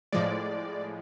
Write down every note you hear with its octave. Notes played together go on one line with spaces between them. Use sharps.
A2 F3 G#3 D5